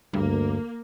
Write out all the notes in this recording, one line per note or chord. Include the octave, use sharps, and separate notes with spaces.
D2 G2 A#3